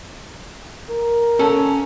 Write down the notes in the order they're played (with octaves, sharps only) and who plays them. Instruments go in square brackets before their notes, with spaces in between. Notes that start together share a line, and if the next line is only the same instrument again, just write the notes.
[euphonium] A#4
[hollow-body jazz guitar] C#4 A4